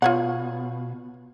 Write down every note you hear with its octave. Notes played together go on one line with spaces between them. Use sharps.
B2 F4 C#5 F#5